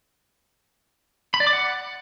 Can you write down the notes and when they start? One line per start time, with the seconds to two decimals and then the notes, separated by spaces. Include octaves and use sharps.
1.34 B5
1.40 D5
1.47 D6
1.53 F#5